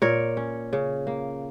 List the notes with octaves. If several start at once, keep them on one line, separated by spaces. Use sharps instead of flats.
A#2 A#4 C#5
C#4
C#3
A#3